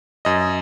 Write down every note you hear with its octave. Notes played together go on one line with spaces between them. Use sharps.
F#2 D#5